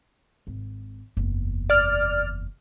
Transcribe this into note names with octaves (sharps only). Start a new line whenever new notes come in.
G#1
F#1 E2
D5 F6